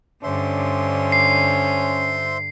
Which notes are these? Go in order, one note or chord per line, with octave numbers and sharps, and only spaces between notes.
G2 D3 C#4 C5 E5 C6
C7